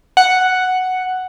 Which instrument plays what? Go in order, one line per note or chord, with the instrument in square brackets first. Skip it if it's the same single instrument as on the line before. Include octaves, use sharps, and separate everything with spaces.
[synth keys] F#5